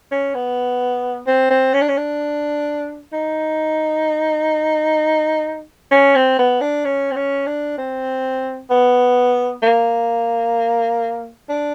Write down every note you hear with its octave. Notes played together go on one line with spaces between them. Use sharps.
C#4
B3
C4
C4
C#4
D4
C#4
D4
D#4
C#4
C4
B3
D4
C#4
C4
C#4
D4
C4
B3
A#3
D4